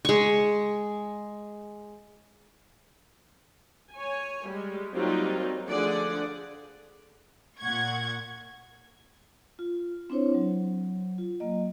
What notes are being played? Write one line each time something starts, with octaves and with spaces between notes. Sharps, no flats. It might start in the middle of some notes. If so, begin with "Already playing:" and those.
G#3 C#6
C#5 G#5
G3 G#3
F#3 G3 A#3 C4 D#4 F4
D3 F3 A3 G#4 D5 F#5
A#2 F#5 C#6 G#6
F4
C4 D4 E4 C5 C#5
F#3
F4
F#3 A#3 D#5